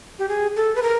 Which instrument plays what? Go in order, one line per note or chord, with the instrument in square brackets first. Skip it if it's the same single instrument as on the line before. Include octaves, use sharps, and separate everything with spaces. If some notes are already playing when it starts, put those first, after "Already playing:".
[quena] G4
G#4
A4
B4
A#4